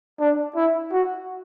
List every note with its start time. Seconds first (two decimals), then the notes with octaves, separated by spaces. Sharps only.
0.20 D4
0.55 E4
0.92 F#4